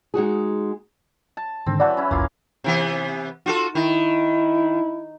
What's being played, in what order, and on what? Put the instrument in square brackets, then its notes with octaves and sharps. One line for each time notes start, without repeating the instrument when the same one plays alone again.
[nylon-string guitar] G#3 D#4 F#4 G#4
[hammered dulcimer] A5
[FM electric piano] G#2 D3 D#3 [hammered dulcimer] C4
[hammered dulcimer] E3 F#3 B5 [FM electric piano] D5 F#5 A5
[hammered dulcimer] C#4 E4
[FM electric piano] G1 C2 F2 [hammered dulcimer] A#3 F4 F5
[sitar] C3 E3 B3
F4 F#4 A4
[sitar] D#3 [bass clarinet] E4